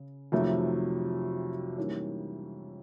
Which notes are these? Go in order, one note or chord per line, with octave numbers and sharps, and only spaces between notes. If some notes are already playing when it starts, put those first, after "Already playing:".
Already playing: C#3
F2 C3 D#3 F#3 A3
G#2 E3 G3 A#3 C#4